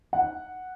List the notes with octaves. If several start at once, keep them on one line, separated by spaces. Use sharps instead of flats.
F#5